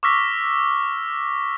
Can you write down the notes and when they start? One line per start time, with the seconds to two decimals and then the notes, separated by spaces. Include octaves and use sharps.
0.03 C#6 D6 E6 F6 A#6 B6